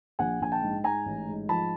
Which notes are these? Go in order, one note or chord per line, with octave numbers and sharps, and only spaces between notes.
A#1 F#5 G#5
A#1 G#5
G5 A5
G#2
G#2 G#5 A#5
A1
G#2
F3 A5 B5